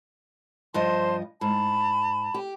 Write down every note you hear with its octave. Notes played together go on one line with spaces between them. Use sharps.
G2 F3 C5 D#5 A5 C6
G#2 A5 B5
G4